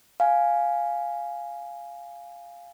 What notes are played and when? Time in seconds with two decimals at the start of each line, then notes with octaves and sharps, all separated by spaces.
0.20 F5 G#5